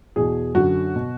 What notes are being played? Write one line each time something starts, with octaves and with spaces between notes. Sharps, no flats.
E2 B2 G#4
F#2 D3 F#4
B2